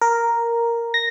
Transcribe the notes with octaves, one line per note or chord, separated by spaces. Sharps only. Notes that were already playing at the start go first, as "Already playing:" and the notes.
A#4
A#6